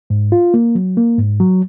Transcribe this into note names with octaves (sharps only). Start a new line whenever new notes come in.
G#2
F4
A#3
F#3
A#3
G#2
F#3